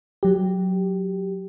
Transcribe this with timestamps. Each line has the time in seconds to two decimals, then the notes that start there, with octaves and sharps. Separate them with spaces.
0.23 F#3 G4